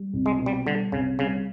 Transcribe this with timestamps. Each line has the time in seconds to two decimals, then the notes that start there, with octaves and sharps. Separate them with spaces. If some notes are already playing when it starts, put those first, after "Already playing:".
Already playing: G3
0.13 C2
0.26 G#3
0.39 B2
0.46 G3
0.66 D3 G3
0.92 C2 C#3
1.19 C#3 G3